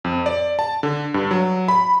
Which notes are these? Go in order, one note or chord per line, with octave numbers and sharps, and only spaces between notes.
F2
D5
A5
D3
G2
F#3
B5